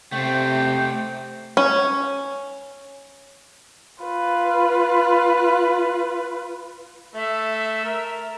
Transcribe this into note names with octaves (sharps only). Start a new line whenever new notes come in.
C3 A3 C4 G5
C#4
F4 B4
A3 E5
A#4